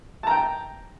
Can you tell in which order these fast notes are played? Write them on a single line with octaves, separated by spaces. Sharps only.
A5 A#5 G5